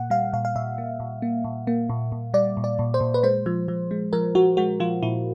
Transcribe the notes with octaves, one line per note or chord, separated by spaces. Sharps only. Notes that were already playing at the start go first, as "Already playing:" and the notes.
Already playing: A#2 A#3 F#5
G3 F5
A#2 F5
F5
A#2 E5
A#3
A#2
A#3
A#2
A#3
A#2
A#2
G3 D5
A#2
D5
A#2
C5
A#2
B4
G#3 C5
F3
F3
G#3
F3 A#4
F3 F#4
G#3 F#4
F3 F4
A#2 E4